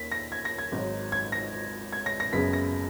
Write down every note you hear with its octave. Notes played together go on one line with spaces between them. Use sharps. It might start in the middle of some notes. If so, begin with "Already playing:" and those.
Already playing: D#2 A#3 B6
A#6
G#6
A#6
G#6
G#1 G#2 F#3
G#6
A#6
G#6
A#6
A#6
F#1 F#2 C#3 G#3 B3 B6
A#6